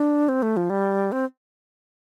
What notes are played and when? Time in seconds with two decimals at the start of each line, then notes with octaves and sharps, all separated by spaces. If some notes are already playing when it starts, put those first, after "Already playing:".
Already playing: D4
0.29 C4
0.42 A3
0.57 F3
0.70 G3
1.12 C4